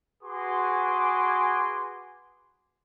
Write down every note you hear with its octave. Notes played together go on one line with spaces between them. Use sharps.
F#4 G#4 B4 G#5 C6 D6